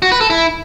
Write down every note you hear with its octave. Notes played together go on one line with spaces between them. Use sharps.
F#4
B4
A4
E4